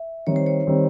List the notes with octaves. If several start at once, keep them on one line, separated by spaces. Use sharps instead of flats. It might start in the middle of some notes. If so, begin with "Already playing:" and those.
Already playing: E5
D#3 G3 C4 C#5
C5
C#5
D#3 G3 C4